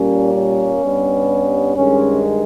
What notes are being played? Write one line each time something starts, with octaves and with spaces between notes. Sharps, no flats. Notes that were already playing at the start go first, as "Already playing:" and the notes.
Already playing: A#2 G3 A#3 C#4
C#4
G2 G3 B3
G2 D#3 G#3 C#4